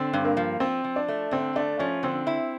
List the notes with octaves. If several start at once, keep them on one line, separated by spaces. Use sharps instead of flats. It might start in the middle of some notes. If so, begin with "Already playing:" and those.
Already playing: D3 C4
G2
A#3
F3
F3 C4
F3
D4
A3
D3 C4
A3 D4
F3 C#4
D3 C4
E4